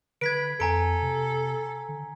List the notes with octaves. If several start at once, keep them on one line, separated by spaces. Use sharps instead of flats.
D3 B4 G#6 B6 D7
F2 A4 G#5 A#5 D7
C3
D3